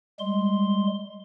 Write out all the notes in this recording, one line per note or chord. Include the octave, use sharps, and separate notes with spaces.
G3 G#3 C6